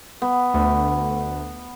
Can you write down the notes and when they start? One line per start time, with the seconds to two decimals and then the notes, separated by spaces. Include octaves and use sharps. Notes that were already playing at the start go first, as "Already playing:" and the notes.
0.22 B3
0.54 D2